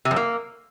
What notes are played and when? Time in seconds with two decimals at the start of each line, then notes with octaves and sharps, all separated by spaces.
0.05 C3
0.11 F#2
0.16 A#3